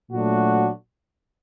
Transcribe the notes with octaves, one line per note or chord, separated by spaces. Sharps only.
A#2 F#3 A3 D4 F#4